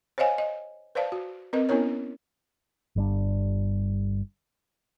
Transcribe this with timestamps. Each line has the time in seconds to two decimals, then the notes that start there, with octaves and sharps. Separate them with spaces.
0.18 C5 C#5 D#5 F5 G#5
0.38 D#5
0.95 B4 C5 D5 F5 A5
1.12 F#4
1.53 C4 A#4 B4 D#5
1.69 B3 C#4 E4 A#4 C#5
2.96 G1 G3 D4